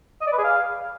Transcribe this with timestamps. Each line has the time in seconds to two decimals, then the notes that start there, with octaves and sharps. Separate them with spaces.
0.21 D#5
0.27 D5
0.32 B4
0.38 G#4
0.44 F5